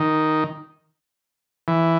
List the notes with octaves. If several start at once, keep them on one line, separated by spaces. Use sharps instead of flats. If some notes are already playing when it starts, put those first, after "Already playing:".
Already playing: D#3
E3